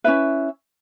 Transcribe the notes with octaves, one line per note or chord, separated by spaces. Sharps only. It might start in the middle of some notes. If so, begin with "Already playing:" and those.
C#4 E4 B4 E5